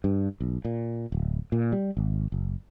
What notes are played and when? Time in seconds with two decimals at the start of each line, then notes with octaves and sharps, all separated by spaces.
0.04 G2
0.40 B1
0.65 A#2
1.12 D1
1.52 A#2
1.72 G3
1.97 G#1
2.32 F#1